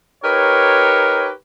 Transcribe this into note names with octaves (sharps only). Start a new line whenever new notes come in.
D#4 G4 A#4 B4 C#5